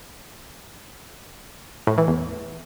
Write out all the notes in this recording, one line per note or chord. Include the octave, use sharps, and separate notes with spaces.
A2
E3
E2